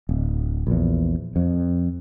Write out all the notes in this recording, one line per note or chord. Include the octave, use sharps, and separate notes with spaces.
D1
A#1 E2
F2